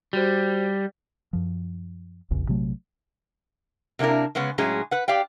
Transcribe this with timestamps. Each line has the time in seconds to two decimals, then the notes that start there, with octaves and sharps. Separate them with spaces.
0.13 G3 F#4 C5
1.33 F#2 F3
2.30 F1 A#1 E2 C#3
2.48 A#1 C3 F#3 A3
3.99 C3 A#3 D4 E4 A#4
4.35 C#3 G#3 B3 C#4
4.58 A2 F#3 G#3 C#4 G#4
4.91 B4 F#5
5.08 G4 D5 F5 G5